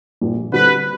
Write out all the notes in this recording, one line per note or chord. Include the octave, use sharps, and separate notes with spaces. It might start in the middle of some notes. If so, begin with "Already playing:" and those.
A#1 A#2 G3
D3 G3 C4 B4